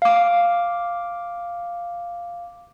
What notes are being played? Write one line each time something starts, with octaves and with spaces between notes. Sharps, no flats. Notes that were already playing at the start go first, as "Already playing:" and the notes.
F5 D6